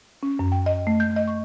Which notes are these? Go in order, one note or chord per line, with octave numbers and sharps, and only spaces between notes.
C#4
F#2
G5
D#5
A3
G6
D#5
C#6